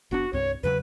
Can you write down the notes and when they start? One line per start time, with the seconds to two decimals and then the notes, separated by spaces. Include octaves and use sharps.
0.11 F1 B3 D4 F#4
0.33 C2 G2 C4 C#5
0.63 E2 C#3 F#3 B4